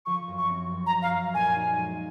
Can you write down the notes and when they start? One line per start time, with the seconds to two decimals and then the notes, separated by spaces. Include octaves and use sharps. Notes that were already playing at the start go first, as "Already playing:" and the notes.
0.06 F3 C#6
0.28 F#2
0.38 C#6
0.48 C4
0.71 F#2
0.86 A#5
0.92 F3
1.02 F5
1.13 F#2
1.34 A#2 G#5
1.55 D#4
1.78 G#3